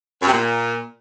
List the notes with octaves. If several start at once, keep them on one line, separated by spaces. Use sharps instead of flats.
F#2
C3
A#2